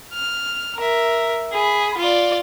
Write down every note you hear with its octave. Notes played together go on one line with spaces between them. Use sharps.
F6
A#4 E5
G#4 B5
F4 D5